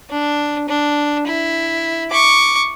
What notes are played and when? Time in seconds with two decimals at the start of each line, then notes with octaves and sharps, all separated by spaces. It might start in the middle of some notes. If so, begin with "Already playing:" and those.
0.10 D4
0.69 D4
1.27 E4
2.11 C#6 D6